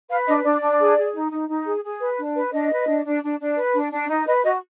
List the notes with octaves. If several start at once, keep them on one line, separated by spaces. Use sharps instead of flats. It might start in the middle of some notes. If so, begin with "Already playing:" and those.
B4 F5
D4 D#5
D4 D5
D4
G#4
G#4
D#4
D#4
D#4
G#4
G#4
B4
D4
B4
D4 D#5
B4
D4
D4
D4
D4
B4
D4
D4
D#4
B4 D#5
F#4 D#5